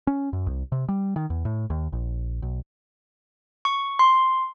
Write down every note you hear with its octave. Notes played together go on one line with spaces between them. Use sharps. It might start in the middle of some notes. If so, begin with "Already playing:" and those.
C#4
F#2
C2
C3
G3
D#3
E2
A2
D#2
A#1
B1
C#6
C6